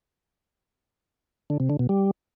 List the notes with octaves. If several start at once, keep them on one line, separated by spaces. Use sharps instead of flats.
D3
C3
D3
B2
G3